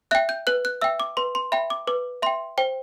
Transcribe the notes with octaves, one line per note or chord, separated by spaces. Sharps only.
E5 G5 F#6
G6
B4 F#6
F#6
E5 G5 E6
D6
B4 C6
C6
E5 G5 B5
D6
B4 D6
E5 G5 C6
C5 G5